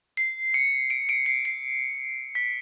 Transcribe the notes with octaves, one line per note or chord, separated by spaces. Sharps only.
C7
C#7
D7
D7
C7
C7
B6